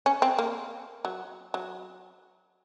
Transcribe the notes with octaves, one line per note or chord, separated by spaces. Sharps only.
C#4
C4
A#3
F#3
F#3